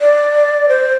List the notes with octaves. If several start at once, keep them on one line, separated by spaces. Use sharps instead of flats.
D5
C5